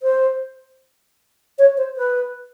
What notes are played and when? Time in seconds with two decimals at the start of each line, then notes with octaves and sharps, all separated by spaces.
0.03 C5
1.58 C#5
1.77 C5
1.97 B4